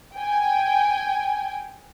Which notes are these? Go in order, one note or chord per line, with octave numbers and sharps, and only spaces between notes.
G5 G#5